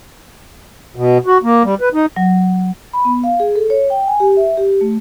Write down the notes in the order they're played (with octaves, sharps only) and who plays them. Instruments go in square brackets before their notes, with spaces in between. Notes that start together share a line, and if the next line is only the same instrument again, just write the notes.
[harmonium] B2
F#4
A#3
G3
B4
D#4
[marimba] F#3
[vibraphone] B5
B3
F5
G#4
A4
C#5
G5
G#5
G4
E5
G4
A3